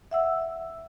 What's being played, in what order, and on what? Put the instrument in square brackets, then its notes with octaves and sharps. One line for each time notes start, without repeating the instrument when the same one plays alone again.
[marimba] E5 F#5 E6